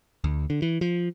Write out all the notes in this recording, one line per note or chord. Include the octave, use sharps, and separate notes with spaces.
D2
D3
E3
F3